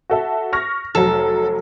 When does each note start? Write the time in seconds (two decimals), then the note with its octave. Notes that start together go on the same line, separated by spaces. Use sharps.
0.10 F#4 A4 E5
0.53 C#6 F6 A#6
0.95 F1 F#3 A4